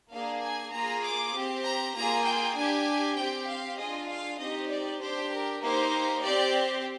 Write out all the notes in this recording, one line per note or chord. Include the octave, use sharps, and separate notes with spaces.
A#3 D4 G#4 F5
G#5
A#3 F4 G#4 A#5
D6
C4 G4
A#5
A#3 F4 G#4 A#5
G5
D4 G4 G#5
C4 G4 G5
F5
D4 F4 G#4 D#5
F5
C4 D#4 G4 D#5
D5
D4 G4 C5
A#4
A#3 D#4 G4 C5
C4 G4 D5